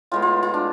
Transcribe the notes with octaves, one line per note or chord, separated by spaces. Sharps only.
A2 G#3 B3 F4
F4
F4
D4